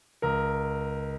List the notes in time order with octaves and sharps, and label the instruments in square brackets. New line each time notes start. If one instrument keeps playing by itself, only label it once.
[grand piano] C#2 A#4